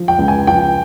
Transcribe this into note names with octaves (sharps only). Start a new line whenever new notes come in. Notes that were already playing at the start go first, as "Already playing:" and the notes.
Already playing: F3
G5
C#2
G#5
F3 G5